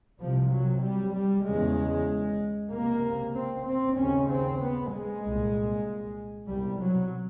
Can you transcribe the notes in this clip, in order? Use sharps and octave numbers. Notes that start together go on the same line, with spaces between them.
C2 C3 F3
F#3
G3
G3
E2 C#3 G#3
C#2 C3 A#3
C4
C4
D#2 C#3 C#4
C4
B3
G#3
C2 A#2
C2 B2 G3
F#3